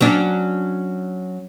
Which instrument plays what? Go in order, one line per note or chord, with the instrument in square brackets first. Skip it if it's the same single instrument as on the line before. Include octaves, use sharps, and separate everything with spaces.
[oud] F#3 C#4 D4